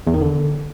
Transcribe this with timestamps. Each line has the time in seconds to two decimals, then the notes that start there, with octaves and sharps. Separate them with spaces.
0.07 E2
0.14 D#3
0.21 D3